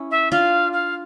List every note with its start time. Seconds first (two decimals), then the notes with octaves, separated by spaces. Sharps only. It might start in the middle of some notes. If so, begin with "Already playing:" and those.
Already playing: C#4 E4
0.11 E5
0.32 D4 F4 F5
0.73 F5